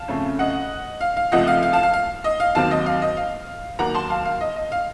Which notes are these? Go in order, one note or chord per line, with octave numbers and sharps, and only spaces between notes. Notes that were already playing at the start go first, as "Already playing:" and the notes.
Already playing: F5 A5
F2 C#3 A3 C#4
D#5 F#5
F5
F5
C#2 C3 F3 A3 D#5 F#5
F5
F5
F5 A5
F5
F5
D#5
F5
D#2 D#3 F#3 C4 F5 A5
D#5
F5
D#5
F5
D#2 D#3 F#3 A#3 F#5 A#5
A5 C6
F5 A5
F5
D#5
D#5
F5